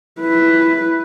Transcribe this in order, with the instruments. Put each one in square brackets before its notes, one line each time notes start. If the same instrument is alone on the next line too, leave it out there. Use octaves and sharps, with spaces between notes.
[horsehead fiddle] E4 B4